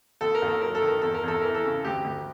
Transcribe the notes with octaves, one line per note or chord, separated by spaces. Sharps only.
D#2 A4
A#4
D#2
A4
F#3 A#4
A4
D#3
A#4
E2 A4
A#4
E2 A4
E3 A#4
A4
C#3
D2 G4
D2